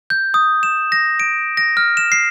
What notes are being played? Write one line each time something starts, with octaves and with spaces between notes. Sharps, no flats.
G6
D#6
E7
A#6
D7
A#6
F6
E7
C7